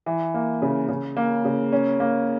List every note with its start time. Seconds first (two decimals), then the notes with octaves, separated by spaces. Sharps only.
0.06 E3
0.34 A#3
0.62 C#3
0.88 C#3
1.17 A#3
1.45 C#3
1.73 C#4
2.00 A#3